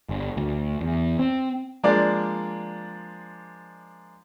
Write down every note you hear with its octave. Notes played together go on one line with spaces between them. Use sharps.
G1
D2
E2
C4
F3 G#3 A#3 D4 D5